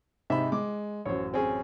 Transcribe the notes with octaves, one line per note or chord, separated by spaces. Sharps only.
G#2 C3 D#4 E5 B5
G#3 D6
A1 F#2 C5 C#5
C4 C#4 G#4